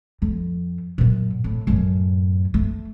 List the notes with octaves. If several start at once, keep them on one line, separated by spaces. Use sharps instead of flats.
F2
F#2 A#2
A2
F#2 A2
A3